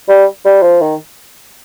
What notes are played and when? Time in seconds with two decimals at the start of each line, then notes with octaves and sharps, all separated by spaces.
0.08 G3
0.45 G3
0.62 F3
0.81 D#3